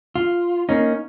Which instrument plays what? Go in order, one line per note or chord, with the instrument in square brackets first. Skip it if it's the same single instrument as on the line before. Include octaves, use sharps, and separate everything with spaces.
[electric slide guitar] F4
[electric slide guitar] A#3 D#4 [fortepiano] C#4